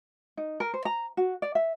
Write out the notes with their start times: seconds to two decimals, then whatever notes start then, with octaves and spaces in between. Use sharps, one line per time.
0.37 D#4
0.60 A#4
0.74 C5
0.85 A#5
1.17 F#4
1.42 D5
1.55 E5